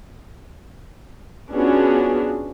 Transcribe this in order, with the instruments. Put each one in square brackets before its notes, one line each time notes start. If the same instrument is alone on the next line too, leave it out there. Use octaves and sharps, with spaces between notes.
[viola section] B3 C#4 D4 F4 F#4 G#4